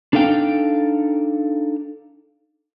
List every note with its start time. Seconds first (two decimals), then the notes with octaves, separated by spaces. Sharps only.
0.13 D4 D#4 A4 F5 G5